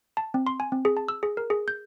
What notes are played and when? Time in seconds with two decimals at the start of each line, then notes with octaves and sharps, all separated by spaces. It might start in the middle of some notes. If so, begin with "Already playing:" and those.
0.17 A5
0.34 C4
0.47 C6
0.60 G#5
0.72 C4
0.85 G#4
0.97 A5
1.08 E6
1.23 G#4
1.37 A#4
1.50 G#4
1.68 G6